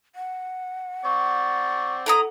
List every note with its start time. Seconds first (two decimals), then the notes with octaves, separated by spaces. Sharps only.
0.15 F#5
1.05 C4 D5 C#6
2.06 E4 A4 A#5 D#6